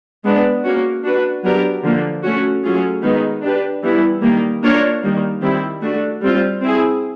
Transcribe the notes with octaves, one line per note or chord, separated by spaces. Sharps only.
G#3 B3 D4
A#3 C#4 F#4
D4 F#4 B4
F#3 B3 D4 G4 A#4
D3 F3 A#3
A3 C#4 F#4
F#3 A3 C#4 F4 G#4
D#3 G#3 B3 D#4 G#4
D4 G4 B4
E3 G3 B3 E4
D#3 G3 A#3
A#3 D4 F4 A#4 C#5
D#3 G3 A#3
D#3 G3 C4 E4 G4
A3 D4 F#4
G3 C4 F4
C4 E4 G#4